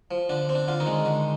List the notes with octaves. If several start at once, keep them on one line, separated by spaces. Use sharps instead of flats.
F3
D3 D4
C4
D4
D3 F4
D#3 D#4
G#3
D3